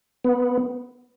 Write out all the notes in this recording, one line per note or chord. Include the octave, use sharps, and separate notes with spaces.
B3